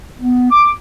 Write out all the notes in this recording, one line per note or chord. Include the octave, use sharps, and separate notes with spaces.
B3
D6